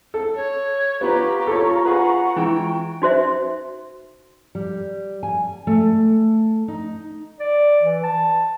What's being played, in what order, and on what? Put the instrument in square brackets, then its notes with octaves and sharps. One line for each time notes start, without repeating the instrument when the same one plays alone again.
[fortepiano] A4
[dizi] C#5
[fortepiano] B3 B4 [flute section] F4 A#5 C#6 [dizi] G4
[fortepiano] A4 C#5
[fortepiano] G#4 B4 [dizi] F#5
[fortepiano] E3 G#3 [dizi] G5
[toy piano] D#4 F#4 C5 E5
[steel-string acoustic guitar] G3
G#5
A3
D#4
[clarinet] D5
E3
A5